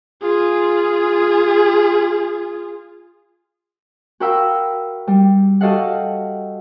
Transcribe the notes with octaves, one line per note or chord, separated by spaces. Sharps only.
F4 G#4
F#4 A#4 F5 G5 B5 E6
G3
F#4 G4 A4 D#5 F5 F#5